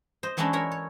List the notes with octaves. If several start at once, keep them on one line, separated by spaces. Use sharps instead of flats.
C5 D#5
E3 F#3 G#3 C#4 D4 E4
E4 A#4 C#5
C#5